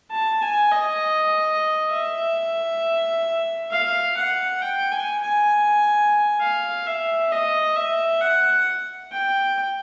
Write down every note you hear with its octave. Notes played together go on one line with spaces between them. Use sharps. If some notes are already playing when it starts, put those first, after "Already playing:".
A5
G#5
D#5
E5
F5
F#5
G5
G#5
G#5
F5
E5
D#5
E5
F#5
G5